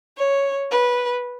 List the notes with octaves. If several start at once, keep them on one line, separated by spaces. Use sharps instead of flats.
C#5
B4